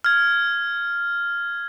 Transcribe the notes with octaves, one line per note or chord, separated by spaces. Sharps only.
F6 G#6